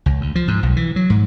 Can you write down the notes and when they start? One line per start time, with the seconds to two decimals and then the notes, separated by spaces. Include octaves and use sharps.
0.06 C#2
0.21 D2
0.35 F3
0.48 G#2
0.63 B1
0.76 E3
0.96 F#3
1.10 G#2